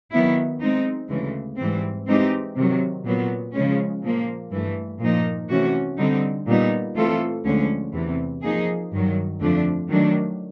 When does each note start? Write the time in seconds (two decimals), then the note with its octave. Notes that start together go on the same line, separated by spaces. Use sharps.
0.11 D#3 F#3 B3 E4
0.61 G#3 C4 D#4
1.09 D2 C#3 E3 G#3
1.58 G#2 E3 G3 C4
2.07 E3 G#3 C4 D#4 G4
2.55 C3 D#3 F#3
3.05 A#2 F#3 B3
3.53 C#3 F3 G#3 C#4
4.02 A#2 F3 A#3
4.51 G2 E3 A3
5.00 A#2 F3 A#3 D#4
5.49 C3 E3 A3 C#4 F#4
5.98 D3 G3 C4 D#4
6.46 A#2 G3 B3 D#4
6.95 E3 A3 C4 F4 A4
7.44 D2 D3 F3 G#3 C#4
7.93 E2 C3 E3
8.42 F3 A#3 D#4 G#4
8.91 G2 D#3 F#3
9.40 F2 D3 F3 A3 D4
9.89 D#3 F#3 A3 D4